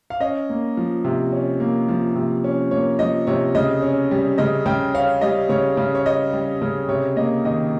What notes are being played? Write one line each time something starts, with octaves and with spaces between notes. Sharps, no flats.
F5
C#4 D#5
A#3
F3
C3
C#4
A#3
F3
C3
C#4
A#3 C#5
F3 D#5
C3 C#5
C#3 D#5
C#4
G3
C#3 D#5
C#3 G5
C#4 F5
G3 D#5
C#3 C#5
C#3
C#5
C#4 D#5
G3
C#3
C3 C#5
A#3 D#5
D#3 D#5